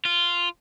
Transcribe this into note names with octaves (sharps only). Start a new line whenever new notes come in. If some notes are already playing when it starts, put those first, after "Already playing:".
F4